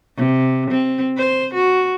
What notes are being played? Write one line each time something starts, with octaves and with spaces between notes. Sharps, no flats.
C3
C4
C5
F#4